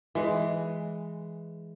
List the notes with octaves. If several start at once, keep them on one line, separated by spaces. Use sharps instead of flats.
E3 G#3